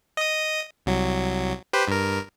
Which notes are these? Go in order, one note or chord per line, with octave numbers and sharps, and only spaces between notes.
D#5 D#6
C2 F#3
G4 B4 C5
G2 A#4